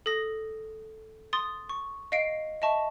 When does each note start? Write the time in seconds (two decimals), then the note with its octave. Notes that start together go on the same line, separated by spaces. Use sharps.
0.06 A4 D#6 A#6
1.33 C6 D#6 A6
1.69 C#6
2.12 D#5 F5 C7 D7
2.62 D#5 E5 A5 C#6